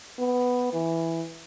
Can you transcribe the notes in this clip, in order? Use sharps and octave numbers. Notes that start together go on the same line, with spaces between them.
B3
E3